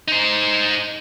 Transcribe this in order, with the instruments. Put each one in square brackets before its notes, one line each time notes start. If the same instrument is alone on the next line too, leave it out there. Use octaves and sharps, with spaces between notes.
[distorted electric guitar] D#4 C5